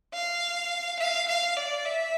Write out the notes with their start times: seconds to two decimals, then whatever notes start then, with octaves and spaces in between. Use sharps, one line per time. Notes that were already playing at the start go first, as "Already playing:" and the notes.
0.14 F5
1.00 F5
1.28 F5
1.57 D5
1.86 E5